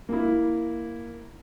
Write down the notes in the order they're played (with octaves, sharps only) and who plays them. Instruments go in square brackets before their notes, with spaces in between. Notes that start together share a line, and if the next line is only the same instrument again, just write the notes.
[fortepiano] A#3 E4